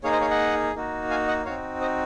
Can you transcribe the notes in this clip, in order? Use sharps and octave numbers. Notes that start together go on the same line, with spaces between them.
A#3 D#4 G#4 C#5 F5
C5 D#5
C#5 F5
D#5 F#5
A#3 D#4 F#4
F5 G#5
D#5 F#5
C4 D#4 F#4 C#5 F5
C5 D#5